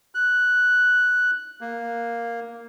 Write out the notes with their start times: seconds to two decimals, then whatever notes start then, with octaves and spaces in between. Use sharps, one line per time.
0.15 F#6
1.61 A#3